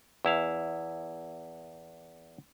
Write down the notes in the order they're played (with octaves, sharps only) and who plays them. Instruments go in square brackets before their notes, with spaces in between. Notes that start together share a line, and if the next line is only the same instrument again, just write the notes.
[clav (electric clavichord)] E2 E4 F5